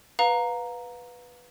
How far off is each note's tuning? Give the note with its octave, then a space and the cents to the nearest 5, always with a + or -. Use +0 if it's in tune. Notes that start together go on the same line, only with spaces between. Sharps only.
B4 -5 F5 +25 A#5 +0